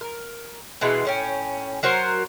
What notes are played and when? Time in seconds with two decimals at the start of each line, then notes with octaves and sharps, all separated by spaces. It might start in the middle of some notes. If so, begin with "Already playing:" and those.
0.01 A#4
0.81 B2 E3 G#3
1.05 A2 C#4 G5
1.83 F#3 F#4 A#4 C5